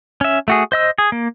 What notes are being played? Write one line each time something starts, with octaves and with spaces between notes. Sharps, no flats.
C#4 E5
A3 F#4 G#4
C5 D#5 E6
G#4
A#3